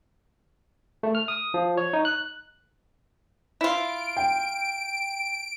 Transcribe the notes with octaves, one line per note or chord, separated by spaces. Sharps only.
A3
F6
D#6
F3
C#5
D#4
F#6
E4 F4 D7
G5